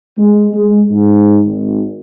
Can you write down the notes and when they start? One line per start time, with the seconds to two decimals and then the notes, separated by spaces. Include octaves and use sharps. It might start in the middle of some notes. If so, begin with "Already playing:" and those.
0.18 G#3
0.54 G#3
0.90 G#2
1.45 G#1